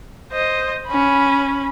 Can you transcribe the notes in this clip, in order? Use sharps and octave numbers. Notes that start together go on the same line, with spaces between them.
C5 D#5
C#4 B5